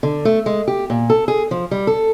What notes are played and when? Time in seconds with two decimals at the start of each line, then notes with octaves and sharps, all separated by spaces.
0.03 D3
0.25 A3
0.46 G#3
0.68 G4
0.90 A#2
1.10 A4
1.28 G#4
1.51 F3
1.71 G3
1.87 A4